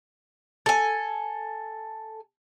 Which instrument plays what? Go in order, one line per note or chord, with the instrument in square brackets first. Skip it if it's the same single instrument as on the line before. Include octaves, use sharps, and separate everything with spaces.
[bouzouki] A4 G#5